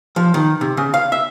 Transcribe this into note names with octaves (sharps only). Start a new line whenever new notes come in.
F3
D#3
C3
C#3
F5
E5